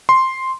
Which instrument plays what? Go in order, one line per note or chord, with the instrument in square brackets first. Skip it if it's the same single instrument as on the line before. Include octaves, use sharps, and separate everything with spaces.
[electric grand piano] C6